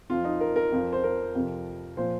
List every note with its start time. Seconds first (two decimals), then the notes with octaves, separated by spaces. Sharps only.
0.10 F2 F3 F4
0.24 D#4
0.41 A#4
0.56 A#4
0.72 F2 F3
0.92 C5
1.03 A#4
1.35 F2 C3 F3
1.97 A#2 F3 C5